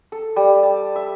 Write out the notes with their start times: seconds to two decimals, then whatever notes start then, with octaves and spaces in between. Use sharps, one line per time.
0.12 A4
0.36 G3
0.63 A5
0.96 E5